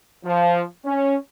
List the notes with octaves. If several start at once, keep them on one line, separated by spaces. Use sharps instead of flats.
F3
C#4